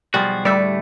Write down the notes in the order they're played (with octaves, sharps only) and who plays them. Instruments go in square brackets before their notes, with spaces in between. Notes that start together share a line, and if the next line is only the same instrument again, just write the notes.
[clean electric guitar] B1 F3 F#4 [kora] G3 F4 G#4
[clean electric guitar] A2 D3 A3 [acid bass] G3 [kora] D5 E5